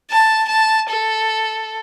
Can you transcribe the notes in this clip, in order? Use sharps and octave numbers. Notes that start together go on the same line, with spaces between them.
A5
A5
A4